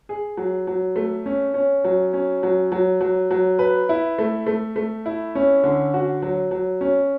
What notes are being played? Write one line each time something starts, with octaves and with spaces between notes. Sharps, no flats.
G#4
F#3
F#3
A3
C#4
C#4
F#3
C#4
F#3
F#3
F#3
F#3
B4
E4
A3
A3
A3
E4
C#4
D3
F#4
F#3
F#3
C#4